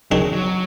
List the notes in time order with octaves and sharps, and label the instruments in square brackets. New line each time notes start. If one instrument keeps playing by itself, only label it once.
[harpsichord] D#3 G#3 D4 [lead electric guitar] F#3
[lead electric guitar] F#3